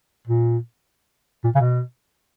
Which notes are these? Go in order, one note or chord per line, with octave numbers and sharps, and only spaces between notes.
A#2
A#2
C#3
B2